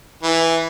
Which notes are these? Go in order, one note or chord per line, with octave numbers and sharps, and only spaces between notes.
E3